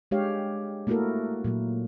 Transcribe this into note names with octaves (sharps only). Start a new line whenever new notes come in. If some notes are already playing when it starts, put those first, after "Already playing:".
G#3 D4 G4 C#5 F5
A3 A#3 E4 F#4 A4 A#4
A#2 F#3 A#3